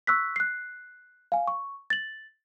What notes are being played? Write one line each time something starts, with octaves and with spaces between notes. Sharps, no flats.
C#6 E6 F#6 B6
F#6 C7
F5 G#5
C#6
A6 F#7